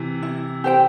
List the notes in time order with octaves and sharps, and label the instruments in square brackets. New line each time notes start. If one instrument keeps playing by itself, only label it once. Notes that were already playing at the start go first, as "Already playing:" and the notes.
Already playing: [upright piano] C3 E3
[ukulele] E4
G4 C5 G5